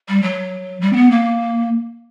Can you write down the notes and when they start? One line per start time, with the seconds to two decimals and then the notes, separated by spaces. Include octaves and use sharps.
0.08 G3
0.22 F#3
0.81 G3
0.93 C4
0.96 B3
1.11 A#3